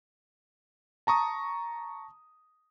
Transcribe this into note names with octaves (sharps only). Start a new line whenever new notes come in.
A5 A#5 C#6 D#6